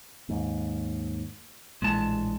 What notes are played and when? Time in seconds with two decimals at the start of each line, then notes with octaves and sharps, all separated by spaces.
0.29 D#2 G#2
1.82 A#1 A2 E3 G#3 A5